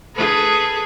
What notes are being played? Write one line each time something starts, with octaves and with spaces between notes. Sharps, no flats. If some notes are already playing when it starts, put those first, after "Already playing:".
G#4 A4 B4